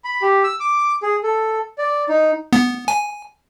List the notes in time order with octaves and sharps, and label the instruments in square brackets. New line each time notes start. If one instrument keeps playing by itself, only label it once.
[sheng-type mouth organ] B5
G4
E6
D6
G#4
A4
D5
D#4
[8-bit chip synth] B3
G#5